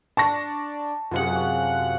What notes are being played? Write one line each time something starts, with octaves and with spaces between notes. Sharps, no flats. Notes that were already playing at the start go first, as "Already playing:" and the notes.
D4 A5 C#6 A#6
F#2 C3 G#3 F4 G#4 F#5
F4 F#4 G#5